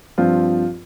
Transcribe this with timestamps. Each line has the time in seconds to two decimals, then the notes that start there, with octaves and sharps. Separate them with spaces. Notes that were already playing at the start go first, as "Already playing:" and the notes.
0.18 G2 F3 C4 F4